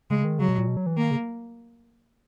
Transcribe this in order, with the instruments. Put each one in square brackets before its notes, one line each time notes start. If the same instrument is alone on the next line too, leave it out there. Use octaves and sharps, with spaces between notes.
[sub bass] C#3 [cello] G#3
[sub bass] D#3
[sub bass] C#3 [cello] F#3
[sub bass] B2
A#2
B2
F#3
E3
[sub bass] D#3 [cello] A#3
[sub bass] C#3